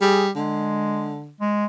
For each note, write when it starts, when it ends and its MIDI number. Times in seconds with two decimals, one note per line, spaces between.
0.02 0.30 55
0.02 0.24 68
0.36 1.32 50
0.36 1.19 56
1.41 1.66 56